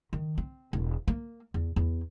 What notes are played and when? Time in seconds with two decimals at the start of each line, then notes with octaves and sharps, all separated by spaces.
0.13 D#3
0.38 C4
0.73 E1
1.08 A#3
1.54 E2
1.76 E2